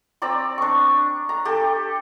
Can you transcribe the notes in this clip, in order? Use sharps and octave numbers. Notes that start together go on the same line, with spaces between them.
C4 D5 A#5 E6
D4 C#6
A#5
G4 A4